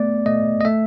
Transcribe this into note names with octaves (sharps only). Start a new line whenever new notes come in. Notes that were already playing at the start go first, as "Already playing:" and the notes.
Already playing: A3 B3 D5
A3 D#5
D#5
A3 E5